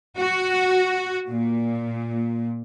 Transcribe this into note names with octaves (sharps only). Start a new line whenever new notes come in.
F#4
A#2